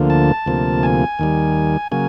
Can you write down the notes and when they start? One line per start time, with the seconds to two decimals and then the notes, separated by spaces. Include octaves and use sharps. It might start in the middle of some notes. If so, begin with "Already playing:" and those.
Already playing: D2 D3 F3 A#3
0.10 A5
0.46 D2 C3 F3 A#3
0.83 G#5
1.19 D#2 D#3 G3
1.92 C#3 F#3 A#3 G#5